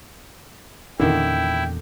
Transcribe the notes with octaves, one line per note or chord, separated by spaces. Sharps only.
E2 A#2 D3 D#3 C#4 E4 G5